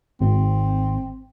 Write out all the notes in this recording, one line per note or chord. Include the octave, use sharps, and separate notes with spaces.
G#1 C4